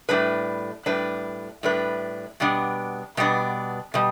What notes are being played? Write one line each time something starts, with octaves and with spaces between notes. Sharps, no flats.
A2 G3 D4 B4
A2 G3 D4 B4
A2 G3 D4 B4
B2 G3 B3 D4
B2 G3 B3 D4
B2 G3